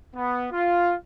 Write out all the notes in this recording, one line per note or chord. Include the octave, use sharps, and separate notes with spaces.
B3
F4